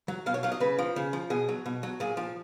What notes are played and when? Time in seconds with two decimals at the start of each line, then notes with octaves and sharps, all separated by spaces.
0.08 F#3
0.26 B2 F5
0.34 C#5
0.43 F#3 F5
0.52 D#5
0.60 C#3 B4
0.79 F3
0.96 C#3
1.13 F3
1.30 B2 G#4
1.49 F#3
1.66 B2
1.83 F#3
2.00 A#2 G#4
2.17 F3